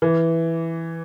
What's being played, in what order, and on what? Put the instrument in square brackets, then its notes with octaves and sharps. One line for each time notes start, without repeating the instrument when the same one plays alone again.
[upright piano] E3